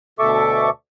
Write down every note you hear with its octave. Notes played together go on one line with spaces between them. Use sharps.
D2 B2 A4 E5 C#6 D6